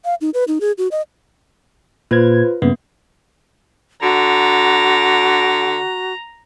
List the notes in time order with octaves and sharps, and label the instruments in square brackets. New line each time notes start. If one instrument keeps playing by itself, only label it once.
[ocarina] F5
D#4
B4
D#4
G#4
F#4
D#5
[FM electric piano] A#2 G#6 [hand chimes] F4 B4 C5
[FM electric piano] G2 C#3 B3 [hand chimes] A#3
[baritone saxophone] D3 [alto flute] F#4 [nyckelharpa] A#5